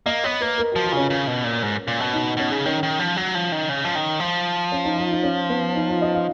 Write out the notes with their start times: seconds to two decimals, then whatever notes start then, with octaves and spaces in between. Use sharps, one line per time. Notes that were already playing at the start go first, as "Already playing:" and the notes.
0.06 A#3 D#5
0.24 B3 C#5
0.41 A#3 B4
0.58 A#4
0.72 F3 F#4
0.85 F4
0.92 C#3 C#4
1.10 C#3
1.28 B2
1.44 A#2
1.63 G#2
1.88 A#2
2.00 B2
2.13 D#4
2.37 B2 C#4
2.51 C#3
2.66 D#3 C#4
2.83 D#3
2.99 F3
3.17 F#3
3.35 F3
3.52 D#3
3.69 C#3
3.85 F3
3.95 D#3
4.20 F3
4.72 C#4
4.85 D#4
4.98 F4
5.11 D#4
5.23 C#4
5.49 B3
5.75 D#4
5.89 F4
6.02 D#5
6.14 F5